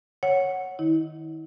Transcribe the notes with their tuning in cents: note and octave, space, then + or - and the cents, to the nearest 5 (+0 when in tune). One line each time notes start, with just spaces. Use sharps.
C#5 -5 F#5 +0
D#3 -5 E4 -40